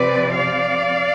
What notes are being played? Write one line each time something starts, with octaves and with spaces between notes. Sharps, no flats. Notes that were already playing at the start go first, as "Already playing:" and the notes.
Already playing: C3 F3 C4 B4 D5
D5 F5